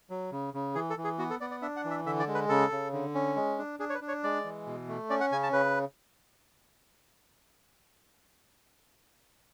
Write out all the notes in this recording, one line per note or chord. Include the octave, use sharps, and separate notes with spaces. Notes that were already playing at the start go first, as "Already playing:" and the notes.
F#3
C#3
C#3
E3 G#4
A4
E3
G#4
B3 F#4
A4
B3 D5
D5
D4 E5
F#5
E3
E5
D3 E5
D5
G#3
B4
C#3 A4
C#3
D3
C#4
G#3
D4
D4 G#4
C#5
B4
D4
C#5
G#3 D5
E3
B2
A3
C#4 D5
F#5
C#3 G#5
A5
C#3 B4